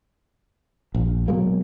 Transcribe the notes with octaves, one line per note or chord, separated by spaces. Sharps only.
A#1
B2 F#3 G#3 A#3